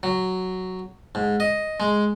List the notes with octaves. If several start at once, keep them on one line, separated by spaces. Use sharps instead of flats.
F#3
G#2
D#5
G#3